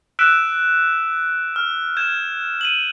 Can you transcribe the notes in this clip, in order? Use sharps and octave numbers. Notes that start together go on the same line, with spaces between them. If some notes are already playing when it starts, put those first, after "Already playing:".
E6 F#6 B6 D7 E7
F6
G6 G#6 E7
D#7 F#7